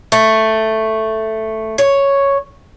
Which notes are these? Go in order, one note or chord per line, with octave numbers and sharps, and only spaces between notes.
A3
C#5